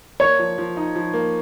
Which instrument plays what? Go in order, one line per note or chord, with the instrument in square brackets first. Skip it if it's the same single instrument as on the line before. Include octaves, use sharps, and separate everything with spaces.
[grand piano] A#3 [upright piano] C#5
[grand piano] F3
F3
D#4
F3
A#3